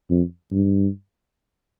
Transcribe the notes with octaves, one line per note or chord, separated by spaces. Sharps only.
F2
G2